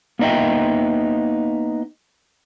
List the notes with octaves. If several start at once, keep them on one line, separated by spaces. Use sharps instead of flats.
A#3 B3 D#4 D#5 E5 G5